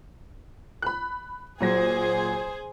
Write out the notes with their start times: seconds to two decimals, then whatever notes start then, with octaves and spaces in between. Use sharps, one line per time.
0.82 B5 F#6
1.61 A#2 F#3 G#4 C5 A#6